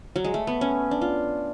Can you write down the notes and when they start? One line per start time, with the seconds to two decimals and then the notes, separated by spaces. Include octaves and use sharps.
0.16 F#3
0.24 G#3
0.34 A3
0.47 B3
0.61 C#4
0.91 D4
1.02 F4